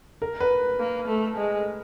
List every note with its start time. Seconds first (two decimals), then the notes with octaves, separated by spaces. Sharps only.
0.22 A#4
0.41 B4
0.79 A#3
1.08 A3
1.37 G#3